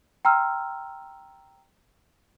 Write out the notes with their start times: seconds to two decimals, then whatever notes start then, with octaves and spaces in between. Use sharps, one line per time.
0.25 G5 A#5 C6 E6 F6